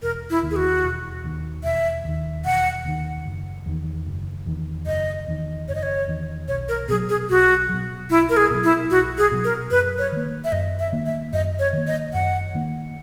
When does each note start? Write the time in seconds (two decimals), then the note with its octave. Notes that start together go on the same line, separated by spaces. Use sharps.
0.02 E1 A#4
0.30 E4
0.43 D#2 D#3
0.51 G#4
0.56 F#4
0.83 E1
1.24 D#2 D#3
1.64 E1 E5
2.04 D#2 D#3
2.45 E1 F#5
2.85 D#2 D#3
3.26 F#1
3.66 E2 D#3
4.06 F#1
4.46 E2 D#3
4.87 F#1 D#5
5.27 E2 D#3
5.68 F#1 C#5
5.75 D#5
5.83 C#5
6.08 E2 D#3
6.48 B1 C#5
6.68 A#4
6.88 B2 G#4
6.92 F#3
7.09 G#4
7.29 B1 F#4
7.69 B2 F#3
8.10 B1 E4
8.29 A#4
8.37 G#4
8.50 B2 F#3
8.64 E4
8.90 B1 F#4
9.18 G#4
9.31 B2 F#3
9.44 A#4
9.71 F#2 B4
9.98 C#5
10.12 D#3 A#3
10.44 E5
10.52 F#2 D#5
10.79 E5
10.92 D#3 A#3
11.06 E5
11.33 F#2 D#5
11.59 C#5
11.73 D#3 A#3
11.87 D#5
12.13 F#2 F#5
12.54 D#3 A#3